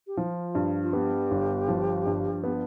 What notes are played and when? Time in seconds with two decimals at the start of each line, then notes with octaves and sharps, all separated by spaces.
0.07 G4
0.17 F3 F4
0.55 G2
0.83 F4
0.93 B3 G4
1.31 G1
1.68 F3
2.06 G2
2.43 B3